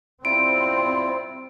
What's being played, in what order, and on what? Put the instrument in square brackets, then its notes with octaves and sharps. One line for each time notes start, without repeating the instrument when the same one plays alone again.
[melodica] G3 E4 F4 [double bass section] C4 [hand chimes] D7